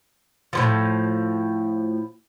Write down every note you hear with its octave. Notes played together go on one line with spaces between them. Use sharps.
A2 D3 F3